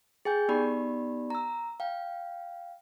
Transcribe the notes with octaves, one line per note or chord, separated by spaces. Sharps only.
G#4 G5 G#5 G6
B3 D#4 G4 D5 B5
A#5 E6
F5 G5